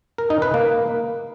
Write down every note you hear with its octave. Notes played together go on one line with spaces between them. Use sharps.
A#4
D#4
B4
A#3